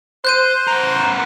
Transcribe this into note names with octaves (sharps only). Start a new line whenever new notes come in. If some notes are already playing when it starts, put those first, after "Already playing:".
C5 F#6 G6 D#7
B3 A#4